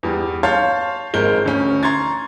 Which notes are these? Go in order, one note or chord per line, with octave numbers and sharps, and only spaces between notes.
E2 G3
C#5 F5 A5 C6 G6 A6
G#1 G#3 A#4 G6 G7
D2 C#4
A#5 C6 C#6 G#6 A6